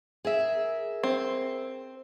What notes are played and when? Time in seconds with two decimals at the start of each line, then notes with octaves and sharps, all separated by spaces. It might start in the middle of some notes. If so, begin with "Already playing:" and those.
0.25 G#4 A#4 E5
1.03 C4